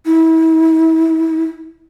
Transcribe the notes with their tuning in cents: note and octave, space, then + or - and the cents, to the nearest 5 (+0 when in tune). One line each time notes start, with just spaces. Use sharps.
E4 -35